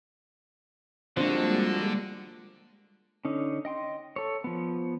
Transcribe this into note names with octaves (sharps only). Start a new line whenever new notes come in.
D3 F3 G3 G#3 A#3 C4 D4 F#4
D3 C#4 D#4
D#5 G5 C6
A4 C#5
F3 B3